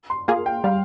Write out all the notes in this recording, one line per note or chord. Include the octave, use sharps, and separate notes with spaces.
C6
A#3 F4 G#4 F5
G5
G3 F5